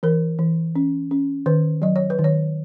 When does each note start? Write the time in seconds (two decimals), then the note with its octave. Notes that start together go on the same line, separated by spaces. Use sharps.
0.03 E3 A#4
0.39 E3
0.75 C#4
1.11 C#4
1.46 D#3 B4
1.82 F#3 D#5
1.96 C#5
2.10 B4
2.19 D#3
2.24 C#5